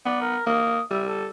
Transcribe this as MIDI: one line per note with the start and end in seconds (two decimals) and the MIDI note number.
0.06 0.38 59
0.06 0.20 74
0.21 0.44 70
0.46 0.81 58
0.46 0.83 87
0.91 1.31 55
0.91 1.02 76
1.08 1.27 69